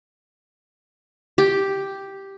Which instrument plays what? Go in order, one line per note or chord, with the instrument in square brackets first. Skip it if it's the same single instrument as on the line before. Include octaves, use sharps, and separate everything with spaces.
[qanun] G4